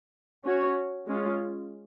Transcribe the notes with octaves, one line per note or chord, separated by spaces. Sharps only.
C#4 F#4 C#5
G#3 C#4 F4